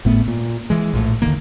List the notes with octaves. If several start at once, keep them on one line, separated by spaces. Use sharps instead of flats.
G#1 A2 A3 B3
A#2
E3 G#3
A#1 A2
E1 D3 D#3 A#3